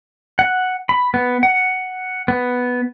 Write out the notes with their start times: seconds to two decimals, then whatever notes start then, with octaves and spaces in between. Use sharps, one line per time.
0.39 F#5
0.89 B5
1.14 B3
1.43 F#5
2.28 B3